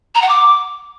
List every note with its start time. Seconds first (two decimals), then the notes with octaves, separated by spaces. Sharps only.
0.15 A#5
0.22 F#5
0.29 D6